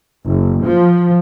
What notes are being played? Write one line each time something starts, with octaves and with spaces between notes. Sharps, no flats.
F#1
F3